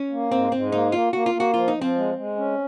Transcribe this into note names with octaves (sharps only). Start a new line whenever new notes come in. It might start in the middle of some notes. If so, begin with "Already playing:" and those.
Already playing: C#4
A#3
G#2 C4
G#2 C4
A#3 D#4
A#3 F4
A#3 F#4
F4
A#3
F#4
F3 F4
D#4
F3
C4
G#3
G#3
C#4